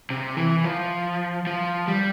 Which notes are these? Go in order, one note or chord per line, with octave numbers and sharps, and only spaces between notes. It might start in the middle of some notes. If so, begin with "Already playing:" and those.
C3
E3
F3
F3
G3